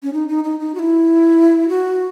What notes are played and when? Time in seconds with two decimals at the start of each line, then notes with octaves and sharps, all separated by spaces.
0.03 C#4
0.13 D#4
0.28 D#4
0.44 D#4
0.59 D#4
0.75 F#4
0.79 E4
1.68 F#4